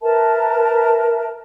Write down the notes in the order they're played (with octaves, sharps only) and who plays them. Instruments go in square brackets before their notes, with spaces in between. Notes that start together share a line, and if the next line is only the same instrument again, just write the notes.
[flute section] A#4 B4 E5 A5